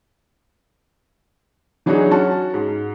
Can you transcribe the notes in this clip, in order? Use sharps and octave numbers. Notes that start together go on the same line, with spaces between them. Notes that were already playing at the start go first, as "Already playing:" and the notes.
E3 F#3 D4 D#4 F#4 G#4
C#4 F#4 A5
G#2